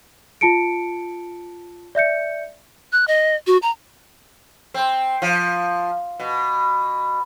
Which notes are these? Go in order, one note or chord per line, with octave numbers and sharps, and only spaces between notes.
F4 A5 C#7 D7
D5 E5 G6 C#7
F#6
D#5
F#4
A#5
C4
F3
B2